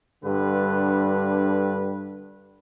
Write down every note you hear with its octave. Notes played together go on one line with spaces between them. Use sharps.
G2 D3 B4